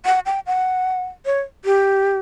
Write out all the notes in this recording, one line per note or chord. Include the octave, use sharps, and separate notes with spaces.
F#5
G5
F#5
C#5
G4